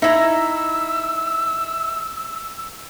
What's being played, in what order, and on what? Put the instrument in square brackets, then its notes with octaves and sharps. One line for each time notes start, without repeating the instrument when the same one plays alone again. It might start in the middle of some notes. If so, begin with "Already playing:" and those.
[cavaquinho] D#4 E4 A#5 [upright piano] E5 [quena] E6